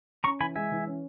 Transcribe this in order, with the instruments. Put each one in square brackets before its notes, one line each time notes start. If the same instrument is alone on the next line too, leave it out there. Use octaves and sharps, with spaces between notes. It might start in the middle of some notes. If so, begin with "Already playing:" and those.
[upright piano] C#4 [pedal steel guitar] A#5 C#6
[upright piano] E3 [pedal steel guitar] G#5 B5
[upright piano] G#3 [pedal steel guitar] E5 G#5
[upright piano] E3
C#4